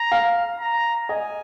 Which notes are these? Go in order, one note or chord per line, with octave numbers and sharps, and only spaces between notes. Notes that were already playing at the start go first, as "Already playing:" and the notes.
Already playing: A#5
F5
A#5
D#5 G#5